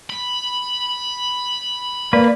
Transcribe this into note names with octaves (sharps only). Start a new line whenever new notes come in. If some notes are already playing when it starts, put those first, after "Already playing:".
B5
A#3 B4 D5